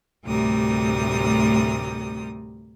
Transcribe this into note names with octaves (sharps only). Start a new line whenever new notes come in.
D2 A2 C3 G3 A#4 D#6